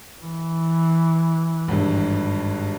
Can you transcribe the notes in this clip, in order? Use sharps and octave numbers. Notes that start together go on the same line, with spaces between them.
E3
G#1 G2